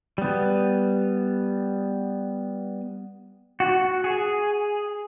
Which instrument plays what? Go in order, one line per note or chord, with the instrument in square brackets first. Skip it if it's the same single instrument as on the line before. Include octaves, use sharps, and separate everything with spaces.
[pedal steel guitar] G3 B3
F#4
G#4